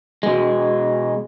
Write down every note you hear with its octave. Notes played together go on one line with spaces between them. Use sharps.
B2 G#3